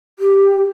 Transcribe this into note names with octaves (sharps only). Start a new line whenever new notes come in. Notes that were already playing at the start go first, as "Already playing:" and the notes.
G4